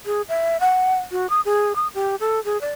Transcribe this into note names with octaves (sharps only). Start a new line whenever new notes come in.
G#4
E5
F#5
F#4
D#6
G#4
D#6
G4
A4
G#4
D5